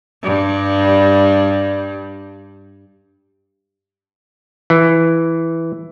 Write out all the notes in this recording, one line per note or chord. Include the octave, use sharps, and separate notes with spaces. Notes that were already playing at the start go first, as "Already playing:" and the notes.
G2 G3
E3